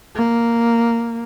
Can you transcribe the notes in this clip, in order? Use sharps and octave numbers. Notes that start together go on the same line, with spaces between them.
A#3